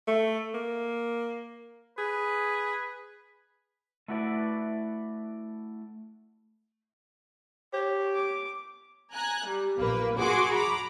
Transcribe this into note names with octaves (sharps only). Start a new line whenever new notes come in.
A3
A#3
G#4 B4
A3 E4 F#4 B4 D5
G4 C#5
D6
G#5 A#5 F#6
G3
A#1 A#2 A#3 B4
F#4 G#4 G#5 C6 D6
A#5 B5 D6